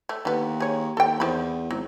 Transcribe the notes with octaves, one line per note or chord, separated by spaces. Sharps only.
A3
D#2 D3 B3
G#4 C#5
D#2 A4 G5
E2 D#3 C4 B5
G#1 F#3